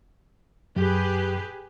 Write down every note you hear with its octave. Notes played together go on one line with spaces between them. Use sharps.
F#2 G4 G#4 B4